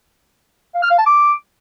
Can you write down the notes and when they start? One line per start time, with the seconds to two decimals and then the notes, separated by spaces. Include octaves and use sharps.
0.75 F5
0.83 F6
0.90 F5
0.98 A5
1.06 D6